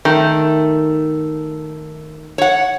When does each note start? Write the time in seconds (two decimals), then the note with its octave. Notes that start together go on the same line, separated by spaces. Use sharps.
0.05 D#3 A3
2.38 C#5 F#5